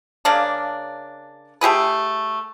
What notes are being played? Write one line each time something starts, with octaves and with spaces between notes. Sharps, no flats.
C#3 A#3 D4
A3 G4 G#4 B4